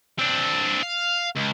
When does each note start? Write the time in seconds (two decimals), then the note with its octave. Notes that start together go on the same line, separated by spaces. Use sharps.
0.19 C4 D4
0.83 F5
1.35 C#2